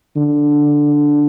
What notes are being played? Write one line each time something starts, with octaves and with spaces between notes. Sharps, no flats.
D3